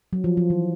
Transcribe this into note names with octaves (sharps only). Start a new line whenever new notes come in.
F#3
F3
F3
E3